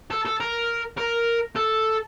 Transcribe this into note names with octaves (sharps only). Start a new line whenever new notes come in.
A4
A4
A#4
A#4
A4